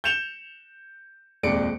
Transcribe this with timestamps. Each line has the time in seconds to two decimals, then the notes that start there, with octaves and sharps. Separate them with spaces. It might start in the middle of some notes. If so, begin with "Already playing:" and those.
0.04 G6 C#7 E7 F7 G7
1.43 D#1 F2 G#3 D5 C#7 D7